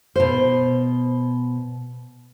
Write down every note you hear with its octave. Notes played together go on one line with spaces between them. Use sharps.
B2 C5